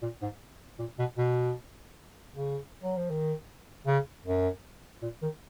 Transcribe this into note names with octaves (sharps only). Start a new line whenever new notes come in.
A#2
G#2
A#2
B2
B2
C#3
F#3
F3
D#3
C#3
F#2
A#2
D#3